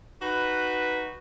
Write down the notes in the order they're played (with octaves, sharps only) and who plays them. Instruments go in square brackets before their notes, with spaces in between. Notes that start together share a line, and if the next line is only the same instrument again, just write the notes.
[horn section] D#4 F#4 B4